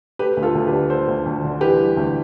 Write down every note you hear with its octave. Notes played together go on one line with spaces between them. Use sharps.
A3 G4 B4
D2
F4 A4
D2
G4 B4
D3
A3 A4 C5
D2
D2
D3
E3 G4 B4
G3
D2